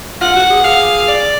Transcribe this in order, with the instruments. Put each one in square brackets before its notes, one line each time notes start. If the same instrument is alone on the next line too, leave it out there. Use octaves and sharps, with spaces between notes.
[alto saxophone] F4 [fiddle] F#5
[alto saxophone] F#4
G#4
[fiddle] F5
D5